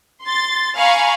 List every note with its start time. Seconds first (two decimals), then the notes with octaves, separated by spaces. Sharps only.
0.25 C6 A6
0.77 F5 G#5 A#5 B5 C#6